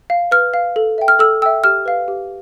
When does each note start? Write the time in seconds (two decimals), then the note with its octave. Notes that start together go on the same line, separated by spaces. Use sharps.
0.10 F5
0.31 B4 F6
0.54 F5
0.76 A4
0.98 E5 G5
1.08 F6
1.19 A4 E6
1.42 G5 E6
1.46 E5
1.64 G4 F6
1.86 B4 F5
2.08 G4